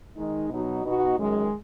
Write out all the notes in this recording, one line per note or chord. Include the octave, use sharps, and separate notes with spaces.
D#3 G#3 D#4
B2 F#3 D#4 F#4
B2 B3 D#4 F#4
F#2 D#3 G#3